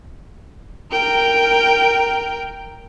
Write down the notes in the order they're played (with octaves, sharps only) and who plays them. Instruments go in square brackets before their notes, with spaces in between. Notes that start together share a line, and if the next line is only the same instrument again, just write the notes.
[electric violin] A#4 G5